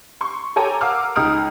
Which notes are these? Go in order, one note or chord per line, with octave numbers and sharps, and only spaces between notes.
C6 C#6
A4 C#5 G5 G#5 A#5 D6
A#4 F5 F#5 D6 E6 F6
C#2 D#4 D#6 F6 D7